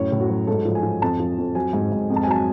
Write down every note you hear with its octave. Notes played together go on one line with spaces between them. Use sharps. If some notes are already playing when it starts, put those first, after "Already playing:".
Already playing: F#2 A2 C#5
A2
F#4
F#3
G#2 A4
F3
G#5
F3
F2 A5
F3
F2
F#3 G#5
G#2
G#2
F2
A5
G#5
F#3 A5